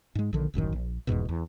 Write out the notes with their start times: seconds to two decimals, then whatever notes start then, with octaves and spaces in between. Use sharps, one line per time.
0.15 G#2 G#3
0.33 A#1 D3 D#3
0.54 D#1 A1 F#2 D#3
0.72 A#1
1.07 F1 E2 G#2 B2
1.29 E2